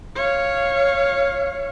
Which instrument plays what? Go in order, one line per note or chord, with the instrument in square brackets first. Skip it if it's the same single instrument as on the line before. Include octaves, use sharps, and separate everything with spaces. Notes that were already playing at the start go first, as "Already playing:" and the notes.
[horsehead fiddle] C#5 F5